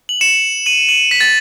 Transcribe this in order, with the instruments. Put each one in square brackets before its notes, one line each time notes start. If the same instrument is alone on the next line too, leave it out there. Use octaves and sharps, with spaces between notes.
[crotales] F#7
C#7 E7
D#7 F#7
D#7 F#7
B6
A6